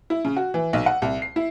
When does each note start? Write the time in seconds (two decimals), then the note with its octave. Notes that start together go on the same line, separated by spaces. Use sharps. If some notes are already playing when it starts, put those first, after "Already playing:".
0.10 E4
0.25 C#3
0.36 F#4
0.54 E3
0.73 B1
0.86 F#5
1.02 C2
1.22 C7
1.36 E4